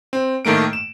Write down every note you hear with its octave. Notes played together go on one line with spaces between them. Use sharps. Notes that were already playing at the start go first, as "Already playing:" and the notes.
C4
A2 D#3 A3 A#3 D7
E7